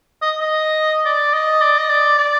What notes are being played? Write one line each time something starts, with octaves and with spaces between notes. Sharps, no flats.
D#5
D#5
D5
D#5
D5
D#5
D5
D5